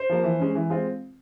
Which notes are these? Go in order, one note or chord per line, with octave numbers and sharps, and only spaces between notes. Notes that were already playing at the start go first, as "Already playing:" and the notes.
Already playing: C5
F3 A#3
E3
G#3 C#4
E3
G#3 C4 F4